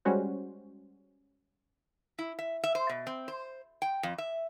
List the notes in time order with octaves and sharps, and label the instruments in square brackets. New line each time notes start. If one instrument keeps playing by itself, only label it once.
[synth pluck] G3 G#3 C#4 F#4 C5
[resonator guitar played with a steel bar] E4
E5
E5
C5
B2
C4
C5
G5
F2
E5